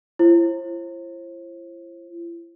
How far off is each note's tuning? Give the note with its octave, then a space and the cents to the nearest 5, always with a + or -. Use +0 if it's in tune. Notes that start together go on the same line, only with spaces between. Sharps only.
E4 +45 C5 +35